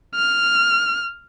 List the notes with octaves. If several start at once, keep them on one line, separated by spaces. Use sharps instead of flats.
F6